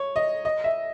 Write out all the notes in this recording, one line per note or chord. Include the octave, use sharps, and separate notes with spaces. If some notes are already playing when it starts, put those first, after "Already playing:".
Already playing: C#5
D#5
D#5
E5